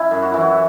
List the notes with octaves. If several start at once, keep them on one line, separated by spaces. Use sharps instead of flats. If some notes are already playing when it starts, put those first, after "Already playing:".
Already playing: C#4 E4
F#2
F#4
E3 E4
F#4